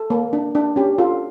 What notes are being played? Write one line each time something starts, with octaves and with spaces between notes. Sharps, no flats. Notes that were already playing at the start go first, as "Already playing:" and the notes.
Already playing: A4
A#3
D4
D4
C#4 G4
F4 A4